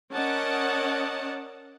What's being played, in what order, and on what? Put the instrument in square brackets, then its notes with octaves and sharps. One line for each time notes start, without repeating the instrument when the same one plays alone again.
[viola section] C#4 A#4 D5 D#5 F#5 A5